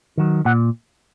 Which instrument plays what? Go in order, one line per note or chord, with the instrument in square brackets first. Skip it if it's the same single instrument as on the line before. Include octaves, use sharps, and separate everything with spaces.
[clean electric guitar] D#3 F#3
A#2 F#5